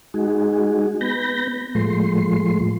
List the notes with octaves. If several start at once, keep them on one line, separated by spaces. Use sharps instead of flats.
G#3 D#4 F#4 G#4
B3 B5 G6 A#6
A2 F3 G#3 A3 C6